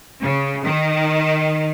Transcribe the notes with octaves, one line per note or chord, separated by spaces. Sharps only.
C#3
D#3